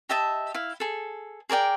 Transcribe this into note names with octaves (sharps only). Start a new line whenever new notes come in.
G4 D#5 E5 A5
E4 F5
G#4 A4
G#4 A#4 D5 G5